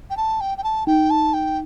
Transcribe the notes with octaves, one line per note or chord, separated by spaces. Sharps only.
G5
A5
G5
G5
A5
D#4 G5
A5
G5